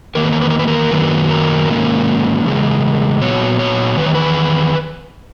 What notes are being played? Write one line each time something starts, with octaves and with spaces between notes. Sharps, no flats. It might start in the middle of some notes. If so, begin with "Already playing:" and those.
E2 D#3 A#3 A#4
B4
A#4
B4
A#4
B4
A#4
F#2 D#3 F#3 A#3 C#4 B4
A#4
G#2 D#3 A#3 C#4
E2 C#3 G#3
A#2 F#3 B3 C#5
C#5
E2 D#3 B4
C#5
B4